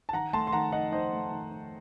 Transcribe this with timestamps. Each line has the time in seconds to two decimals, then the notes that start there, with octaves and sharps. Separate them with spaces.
0.09 A5
0.13 D#3 F#5 A#5
0.33 A3 A5 C6
0.47 C6
0.52 D#3 F#5 A#5
0.72 D#4 D#5 F#5
0.92 D#3 C5 D#5
1.13 A3
1.32 D#3
1.51 D#4